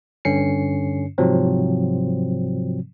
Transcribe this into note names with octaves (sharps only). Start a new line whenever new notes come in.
G2 D3 C#4 C7 C#7
G#2 C3 F3 F#3 C4